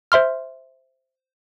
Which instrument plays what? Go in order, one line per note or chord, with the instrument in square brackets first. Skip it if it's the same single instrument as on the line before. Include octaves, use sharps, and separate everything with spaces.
[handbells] C5 E5 C6 F6